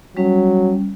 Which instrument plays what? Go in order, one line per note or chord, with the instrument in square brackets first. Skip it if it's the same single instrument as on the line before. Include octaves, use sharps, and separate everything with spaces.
[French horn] F#3 [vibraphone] G3 C#4